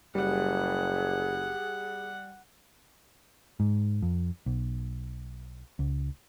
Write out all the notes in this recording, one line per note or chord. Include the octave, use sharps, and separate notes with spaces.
F#1 G3 G#4 F#5
G#2
F2
B1
C#2